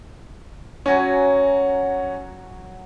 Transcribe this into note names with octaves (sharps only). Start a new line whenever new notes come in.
F#3 C#4 F#4 G#5